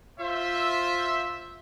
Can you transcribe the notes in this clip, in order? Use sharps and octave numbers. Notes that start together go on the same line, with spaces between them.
F4 C5 E5